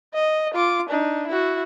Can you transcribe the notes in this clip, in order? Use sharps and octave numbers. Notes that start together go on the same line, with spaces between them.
D#5
F4 D6
D4 D#4
E4 F#4